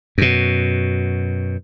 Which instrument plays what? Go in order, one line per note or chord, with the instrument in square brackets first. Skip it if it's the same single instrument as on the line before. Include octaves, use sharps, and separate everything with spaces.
[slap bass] F#2 B2